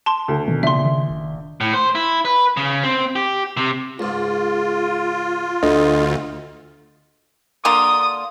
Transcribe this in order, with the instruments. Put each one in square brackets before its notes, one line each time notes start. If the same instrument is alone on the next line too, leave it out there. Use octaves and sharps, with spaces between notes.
[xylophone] A5 C6
[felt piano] D2
[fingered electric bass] B2 [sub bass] D#3
[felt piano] A#1 [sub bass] C#3 [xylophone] E5 C6
[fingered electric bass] D#3
[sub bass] F1
[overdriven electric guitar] A2
C5
E4
B4
C#3
C4
G4
C3
[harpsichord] C#2 G#2 [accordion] F4
[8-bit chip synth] D2 [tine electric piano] D4 A4 D#5
[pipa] D3 A#3 F4 [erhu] D#6